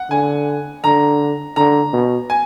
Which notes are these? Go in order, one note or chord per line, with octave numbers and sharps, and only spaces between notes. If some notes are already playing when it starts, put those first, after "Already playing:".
Already playing: F#5
D3 G#5
D3 A#5
D3 A#5
B2
G#5